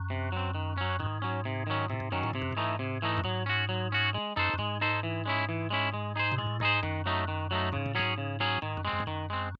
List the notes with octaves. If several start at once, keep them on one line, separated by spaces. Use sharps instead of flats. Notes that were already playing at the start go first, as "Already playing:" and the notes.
Already playing: F#2
C3
F#3 C4
D#3
F#3 C#4
G#2 D#3
F#3 C#4
C3
D#3 F#3 C#4
A2 C3
G#2
F#2 D#3 F#3 C#4
A2
G#2 C3
F#2
G#2 E3 A3 D#4
C3
E3 A3 D#4
F#2
G#2 F#3
C#4 F#4
F#3
C#4 F#4
G#3
F#2 D#4 A4 C5
F#2
G#2 G#3
D#4 A4 C5
E3
G#3 C#4 E4
E3
G#3 C#4 E4
G#3
D#4 G#4 C5
C3
A2 G#3
G#2 D#4 G#4 C5
F#2 D#3
F#3 A3 D#4
D#3
F#3 A3 D#4
G#2 C#3
A2
G#2 F#3 C#4 G#4
C#3
F#3 C#4 G#4
G#2 D#3
F#2
G#3 C4
F#2
G#2
F#2 D#3
G#3 C4